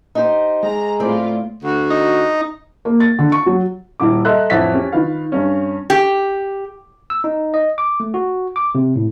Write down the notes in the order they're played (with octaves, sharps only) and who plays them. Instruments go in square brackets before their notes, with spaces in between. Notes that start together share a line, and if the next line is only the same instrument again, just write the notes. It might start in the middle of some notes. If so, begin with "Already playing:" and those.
[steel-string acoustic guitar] D#4 G4 C5
[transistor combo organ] G#3 [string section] A#5
[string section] A2 F4 [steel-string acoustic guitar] C4 D5
[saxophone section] D2 F#4
[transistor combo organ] D#4
[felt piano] A#3
A6
D3
C#6
F#3
[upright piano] D#1 E4 D6
A4 D#5 E5 A#5 C6 F#6
A1 F2 E5 A6 B6
C#4 G4
D#3 F4 B4 F5
G2 C#4
[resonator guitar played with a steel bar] G4
[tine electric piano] E6
D#4
D#5
D6
A3
F#4
D6
C3
A2